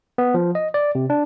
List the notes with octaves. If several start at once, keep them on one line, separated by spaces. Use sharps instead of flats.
B3
F3
D#5
D5
C3
D4